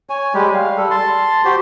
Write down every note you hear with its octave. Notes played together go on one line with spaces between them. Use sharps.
C#5 G#5
G3 G#3 G4
F5
G3 A4
A5 C6
F#4 G4 C5